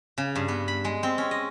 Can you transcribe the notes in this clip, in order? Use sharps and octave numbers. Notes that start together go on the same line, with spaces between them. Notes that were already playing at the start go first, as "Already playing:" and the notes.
C#3
G2
B3
B5
G#3
C4
C#4
D#5